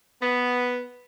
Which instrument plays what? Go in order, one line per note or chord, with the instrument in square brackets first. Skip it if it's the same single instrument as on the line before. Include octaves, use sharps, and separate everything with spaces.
[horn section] B3